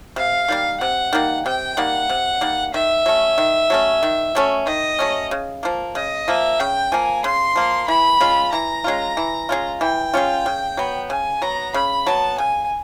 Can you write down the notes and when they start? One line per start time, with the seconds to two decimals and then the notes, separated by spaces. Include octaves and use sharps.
0.16 C3 F5
0.48 D#3 G3 A#3
0.80 C3 F#5
1.13 D#3 G3 A#3
1.46 C3 G5
1.77 D#3 G3 A#3 F#5
2.09 C3
2.41 D#3 G3 A#3
2.74 D#3 E5
3.06 F#3 A3 C#4
3.38 D#3
3.70 F#3 A3 C#4
4.03 D#3
4.35 F#3 A3 C#4
4.66 D#3 D#5
4.99 F#3 A3 C#4
5.31 C#3
5.63 F3 A#3
5.95 C#3 D#5
6.28 F3 A#3 E5
6.60 C#3 G5
6.92 F3 A#3 G#5
7.24 C#3 C6
7.56 F3 A#3
7.88 E3 B5
8.20 G#3 C#4 F4
8.52 E3 A#5
8.84 G#3 C#4 F4
9.17 E3
9.49 G#3 C#4 F4
9.81 E3 G5
10.14 G#3 C#4 F4
10.46 C#3
10.77 F#3 B3
11.10 C#3 G#5
11.42 F#3 B3 A#5
11.74 C#3 B5
12.07 F#3 B3 A5
12.38 C#3 G#5